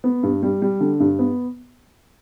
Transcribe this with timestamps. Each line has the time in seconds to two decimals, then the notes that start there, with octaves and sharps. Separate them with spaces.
0.04 B3
0.23 G2
0.43 G3
0.62 G3
0.80 D3
1.00 G2
1.19 B3